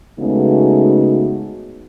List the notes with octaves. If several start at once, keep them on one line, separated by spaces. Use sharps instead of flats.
C#3 G#3 A3 B3 D#4 F#4